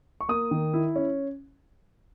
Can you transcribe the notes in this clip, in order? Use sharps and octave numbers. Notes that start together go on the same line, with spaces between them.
C#6
A#3 D#6
D#3
E4
C#4